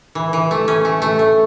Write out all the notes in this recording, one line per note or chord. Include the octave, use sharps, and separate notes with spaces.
E3
E3
A3
C#4
A3
A3
A3